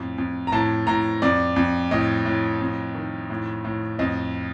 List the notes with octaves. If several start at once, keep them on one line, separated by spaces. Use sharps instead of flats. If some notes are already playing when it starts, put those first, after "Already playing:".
Already playing: F2 A2
F2
A#5
A2 A5
A2 A#5
F2 D5
F2
A2 D#5
A2
F2
D#3
A2
A2
F2 D#5